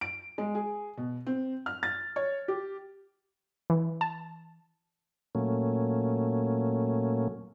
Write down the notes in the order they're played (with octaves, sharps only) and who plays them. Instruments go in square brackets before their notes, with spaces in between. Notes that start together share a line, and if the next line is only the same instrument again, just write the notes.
[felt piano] D7
G#3
G#4
B2
C4
F6
A6
C#5
G4
[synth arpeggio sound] E3
A5
[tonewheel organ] A#2 F#3 A3 A#3 C#4